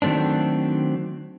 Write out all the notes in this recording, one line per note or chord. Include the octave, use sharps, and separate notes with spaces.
D#3 F#3 A3 C4 D4